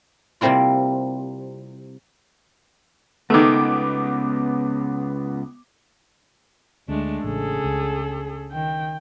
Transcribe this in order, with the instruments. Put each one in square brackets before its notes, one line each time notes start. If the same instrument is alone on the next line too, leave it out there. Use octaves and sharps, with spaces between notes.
[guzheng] C3 G3 A#3 C4 E4 F4
[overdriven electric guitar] C#2 [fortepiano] D#3 A3 [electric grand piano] B3 D6
[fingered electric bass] D2 [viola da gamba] G#3 A3 D4
[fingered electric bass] A1 [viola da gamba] C#3 [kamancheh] G#4 A4
[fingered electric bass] C#2
[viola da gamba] D#3 [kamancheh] G5